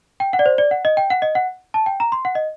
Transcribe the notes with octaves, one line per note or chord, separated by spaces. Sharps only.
G5
F#5
D5
C5
D5
F#5
D#5
G5
F#5
D#5
F#5
A5
G5
A#5
C6
F#5
D#5